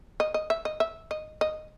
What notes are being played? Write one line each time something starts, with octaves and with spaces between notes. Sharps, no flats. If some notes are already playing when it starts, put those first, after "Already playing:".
D#5
D#5
E5
D#5
E5
D#5
D#5